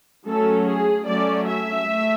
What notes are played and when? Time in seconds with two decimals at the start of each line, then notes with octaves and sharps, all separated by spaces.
0.27 F#3 A3 C#4 A4
0.67 G#4
1.06 F#3 A3 C#4 D5
1.47 E5
1.86 A3